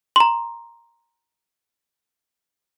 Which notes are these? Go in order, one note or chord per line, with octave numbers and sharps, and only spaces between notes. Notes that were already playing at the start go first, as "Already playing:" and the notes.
A#5 C6